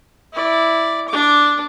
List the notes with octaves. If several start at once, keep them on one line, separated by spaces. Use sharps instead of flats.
E4 D5
D4 D6